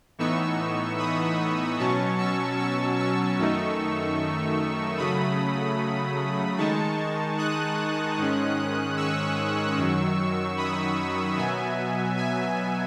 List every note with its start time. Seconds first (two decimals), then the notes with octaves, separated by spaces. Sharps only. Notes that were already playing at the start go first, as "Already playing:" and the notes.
0.18 A2 E3 B3 D#4 C#6 E6
0.99 B5 D#6
1.78 B2 F#3 C#4 A5 C#6
2.18 C#6 E6
2.58 C#6 E6
2.98 C#6 E6
3.38 F#2 D#3 A3 D#4
4.98 C#3 F#3 A3 B5 D#6
6.58 D#3 G#3 D#4 A5 C#6
7.38 D#6 F#6
8.17 G#2 D#3 G#3 C#4
8.97 C#6 E6
9.78 F#2 D#3 F#3
10.57 B5 D#6
11.37 B2 F#3 B3 E5 G#5
12.17 E5 G#5